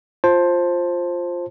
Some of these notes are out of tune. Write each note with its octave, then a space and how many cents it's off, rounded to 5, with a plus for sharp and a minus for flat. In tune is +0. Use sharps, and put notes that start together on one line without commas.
F4 +0 C5 +15 A5 +0